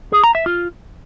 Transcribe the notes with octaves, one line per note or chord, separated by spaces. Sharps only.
G#4
A#5
E5
F4